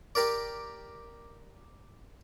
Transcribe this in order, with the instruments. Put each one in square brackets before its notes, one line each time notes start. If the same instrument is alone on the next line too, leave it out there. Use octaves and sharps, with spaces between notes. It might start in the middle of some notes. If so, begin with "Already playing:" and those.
[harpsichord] G4 A#4 D5